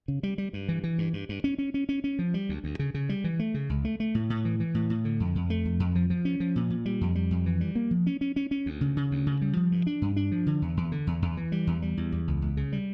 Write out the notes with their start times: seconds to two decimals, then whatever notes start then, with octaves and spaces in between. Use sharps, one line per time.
0.08 C#3
0.23 G3
0.38 G3
0.53 G2
0.69 E3
0.84 E3
0.98 G2
1.13 G2
1.29 G2
1.44 C#4
1.58 C#4
1.74 C#4
1.89 C#4
2.04 C#4
2.19 F3
2.34 G3
2.49 D2
2.64 D2
2.79 C#3
2.94 C#3
3.09 G3
3.24 E3
3.39 A3
3.54 C#3
3.70 C#2
3.85 A3
4.00 A3
4.15 A2
4.30 A2
4.45 E3
4.60 E3
4.74 A2
4.90 A2
5.05 D3
5.20 F2
5.35 F2
5.50 A3
5.65 F2
5.80 F2
5.95 F3
6.10 F3
6.25 C#4
6.40 F3
6.56 A#2
6.70 A#2
6.86 G3
7.01 F2
7.15 G3
7.31 F2
7.46 E3
7.61 G3
7.75 A#3
7.91 F3
8.07 C#4
8.21 C#4
8.36 C#4
8.51 C#4
8.66 D2
8.81 C#3
8.97 C#3
9.11 D2
9.26 C#3
9.41 G3
9.57 F3
9.72 G2
9.87 D4
10.02 G2
10.16 D4
10.31 F3
10.46 D3
10.62 E2
10.77 E2
10.92 D3
11.07 E2
11.22 E2
11.37 E3
11.52 G3
11.67 E2
11.82 G3
11.97 E2
12.12 E2
12.28 C#2
12.42 C#2
12.57 C#3
12.72 G3